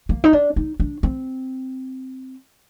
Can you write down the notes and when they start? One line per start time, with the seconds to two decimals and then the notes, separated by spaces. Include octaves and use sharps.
0.09 A#3
0.24 D#4
0.33 D4
0.56 D#4
0.80 D4
1.03 C4